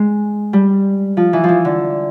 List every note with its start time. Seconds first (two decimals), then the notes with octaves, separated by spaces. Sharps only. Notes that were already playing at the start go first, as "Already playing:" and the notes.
Already playing: G#3
0.53 G3
1.17 F3
1.33 E3
1.44 E3 F3
1.65 D3